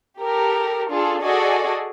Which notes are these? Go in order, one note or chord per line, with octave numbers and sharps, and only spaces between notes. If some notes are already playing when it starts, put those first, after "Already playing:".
G4 A4 A#4
D4 F4 G#4 A4
F#4 G#4 A4 D5 D#5 G#5